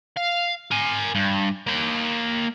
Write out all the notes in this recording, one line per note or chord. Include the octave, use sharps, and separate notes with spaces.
F5
A#4 G#5
G2
A#3 G5